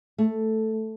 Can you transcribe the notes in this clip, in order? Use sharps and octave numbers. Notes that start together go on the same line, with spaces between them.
A3